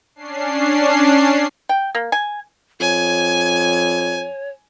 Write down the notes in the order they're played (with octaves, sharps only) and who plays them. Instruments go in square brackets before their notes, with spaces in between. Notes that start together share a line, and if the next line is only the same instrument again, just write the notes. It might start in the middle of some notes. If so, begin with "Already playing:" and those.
[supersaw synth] C#4 D4 C7
[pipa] G5
A#3
G#5
[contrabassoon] F2 [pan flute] C#5 [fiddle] G#5